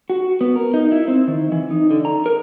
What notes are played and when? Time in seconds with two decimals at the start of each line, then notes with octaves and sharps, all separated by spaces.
0.10 F#4
0.41 B3
0.56 A#4
0.74 D#4
0.92 E4
1.08 C4
1.28 D#3
1.52 E3
1.71 D#4
1.91 D3
2.05 A#5
2.26 A#4